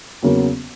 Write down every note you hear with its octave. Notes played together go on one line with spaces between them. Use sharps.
E2 C#3 F#3 A#3 C#4